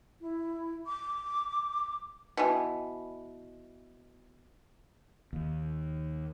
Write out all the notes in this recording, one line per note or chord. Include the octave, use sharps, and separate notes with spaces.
E4
D6
B2 E3
D#2